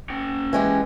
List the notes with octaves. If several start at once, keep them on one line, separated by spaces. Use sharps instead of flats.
C#4 G5
E3 G#3 G4